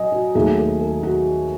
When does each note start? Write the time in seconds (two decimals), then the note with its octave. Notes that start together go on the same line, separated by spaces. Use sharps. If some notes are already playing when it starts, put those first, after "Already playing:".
Already playing: F#3 D#5 G#5
0.12 F#4
0.35 D#2 D#3 F#3 A3 G#4
0.58 A4
0.81 A4
1.03 F#4